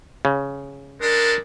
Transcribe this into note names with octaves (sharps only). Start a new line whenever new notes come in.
C#3
G3 G#3 D4 A#4